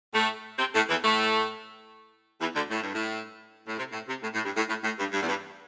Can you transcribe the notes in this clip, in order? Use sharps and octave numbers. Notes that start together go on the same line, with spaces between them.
A2 A3
C3 C4
A2 A3
E2 E3
A2 A3
E2 E3
D2 D3
A2
G2
A2
A2
C3
A2
C3
A2
A2
G2
A2
A2
A2
G2
G2
E2
G2